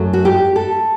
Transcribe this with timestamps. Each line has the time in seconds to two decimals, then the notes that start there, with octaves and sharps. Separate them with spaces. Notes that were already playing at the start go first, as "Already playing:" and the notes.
Already playing: F#2 F#3 A3
0.13 F#4
0.25 G4
0.56 A4